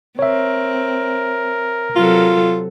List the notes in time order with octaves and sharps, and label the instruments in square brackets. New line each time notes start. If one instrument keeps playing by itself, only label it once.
[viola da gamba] C4 [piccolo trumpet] A#4 [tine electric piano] C#5 E5
[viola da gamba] C3 F#3 A4 [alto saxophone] F4